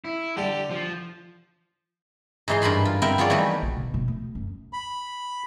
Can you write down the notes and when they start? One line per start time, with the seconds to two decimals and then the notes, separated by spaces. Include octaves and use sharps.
0.05 E4
0.37 D3 G4 A4
0.71 F3
2.48 G#2 E3 D#4 G#4 C6
2.62 G2 A#4 A5 B5 C6
2.85 F4
3.02 B3 C4 E4 A#4 E5 G5
3.18 F3 B3 F4 G#4 C#5 D5
3.30 D#3 E3 F#3 G3 A3
3.62 A#1
3.77 B2
3.94 B2
4.08 A3
4.35 F#2
4.73 B5